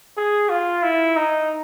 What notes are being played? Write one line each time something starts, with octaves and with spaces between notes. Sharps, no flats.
G#4
F4
E4
D#4